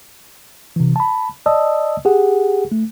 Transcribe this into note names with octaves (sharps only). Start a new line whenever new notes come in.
C3 E3
A5 B5
D5 D#5 A5 D#6 E6
G4 G#4 F#5
A3